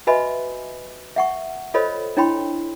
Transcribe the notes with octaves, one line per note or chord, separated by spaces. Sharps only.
F#4 B4 D#5 E5 G#5 B5
E5 F#5 C#6
F4 A4 C5 C#5 D#5 B5
D4 E4 C#5 G5 B5 C6